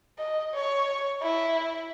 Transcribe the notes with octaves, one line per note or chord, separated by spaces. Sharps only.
D#5
C#5
E4